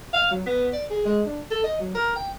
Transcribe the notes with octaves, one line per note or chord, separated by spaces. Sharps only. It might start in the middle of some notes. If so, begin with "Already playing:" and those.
F5
F#3
B3
D5
G#4
G#3
D4
A4
D#5
F#3
A#4
G5